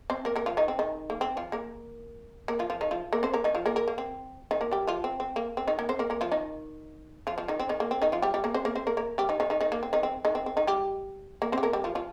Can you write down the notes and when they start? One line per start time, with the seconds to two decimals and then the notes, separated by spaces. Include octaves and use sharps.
0.10 C4 C5
0.25 A#3 A#4
0.36 A#3 A#4
0.46 F3 F4
0.57 D#3 D#4
0.68 C4
0.79 D#3 D#4
1.10 A#3
1.21 C4
1.37 F3 F4
1.52 A#3 A#4
2.48 A#3 A#4
2.59 F3 F4
2.70 F3 F4
2.81 D#3 D#4
2.91 F3 F4
3.13 A#3 A#4
3.23 C4 C5
3.34 A#3 A#4
3.44 D#3 D#4
3.55 F3 F4
3.66 A#3 A#4
3.76 A#3 A#4
3.88 A#3
3.98 C4
4.51 D#3 D#4
4.61 A#3 A#4
4.71 G3 G4
4.87 F3 F4
5.04 C4
5.20 C4
5.36 A#3
5.57 C4
5.68 D#3 D#4
5.79 A#3 A#4
5.89 C4 C5
5.99 A#3 A#4
6.10 A#3 A#4
6.21 F3 F4
6.32 D#3 D#4
7.27 F3 F4
7.38 F3 F4
7.48 D#3 D#4
7.59 C4
7.69 D#3 D#4
7.80 A#3
7.91 C4
8.02 D#3 D#4
8.12 F3 F4
8.22 G3 G4
8.34 G3 G4
8.44 A#3 A#4
8.54 C4 C5
8.65 A#3 A#4
8.75 C4 C5
8.87 A#3 A#4
8.97 A#3 A#4
9.18 G3 G4
9.29 D#3 D#4
9.40 D#3 D#4
9.50 D#3 D#4
9.61 D#3 D#4
9.72 A#3
9.83 C4
9.93 D#3 D#4
10.03 C4
10.25 D#3 D#4
10.35 C4
10.46 C4
10.57 D#3 D#4
10.67 G3 G4
11.42 A#3 A#4
11.52 C4 C5
11.58 G4
11.63 A#3 A#4
11.73 G3 G4
11.84 F3 F4
11.95 F3 F4